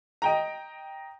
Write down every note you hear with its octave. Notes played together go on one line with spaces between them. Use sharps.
D#5 G5 A#5